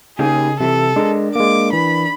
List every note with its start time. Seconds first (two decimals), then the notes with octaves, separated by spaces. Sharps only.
0.19 C#3 A#3 D#4 G4 G#4
0.60 C3 E3 F#3 A4
0.96 G#3 D4 A#4
1.36 G#3 A#3 D6
1.73 E3 B5